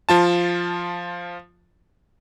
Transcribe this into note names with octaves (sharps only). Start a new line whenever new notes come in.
F3 F4 A5